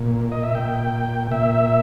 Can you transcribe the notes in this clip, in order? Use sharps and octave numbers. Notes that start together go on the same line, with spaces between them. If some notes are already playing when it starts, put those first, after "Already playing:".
Already playing: A#2
D#5
E5
A#2 G5
A#2 E5